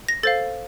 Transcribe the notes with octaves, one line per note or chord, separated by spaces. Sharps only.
A#6
A4 C5 F5 A6